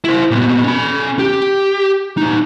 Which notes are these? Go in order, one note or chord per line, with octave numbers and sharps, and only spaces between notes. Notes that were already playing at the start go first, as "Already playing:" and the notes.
E4 C5
A#2 B3
C#4 B5
G4
A#2 D#4